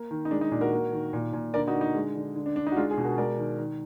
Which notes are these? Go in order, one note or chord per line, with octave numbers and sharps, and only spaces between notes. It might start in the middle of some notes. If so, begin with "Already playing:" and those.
Already playing: A#3
D#3
D#4
G#3 D4
D#4
A#2 D4
F#4 A#4
A#3
D#3
A#2
A#2
D3 A#4 D5
D#4 F#4
D3
D#4
G#3
D3
D3
D4
D3 D4
D#4
F#4
G#3 D4 F4
F4 G#4
B2
F#4 A#4
G#3 A#4 D5
D#3
D#3